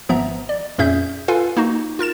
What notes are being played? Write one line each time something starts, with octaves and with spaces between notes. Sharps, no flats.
G#1 F3 B3 E5 A#5
D5
F2 A#2 C#4 G#4 E5 G6
F4 A4 B4 F5 G#5
A#3 D#4 F#4
F4 A#4 A6 E7